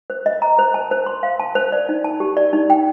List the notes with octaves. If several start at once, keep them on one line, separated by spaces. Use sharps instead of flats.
C5
D#5
A#5
C5
A5
C5
C6
F5
A5
C5
D5
D#4
A5
G4
D5
D#4
G5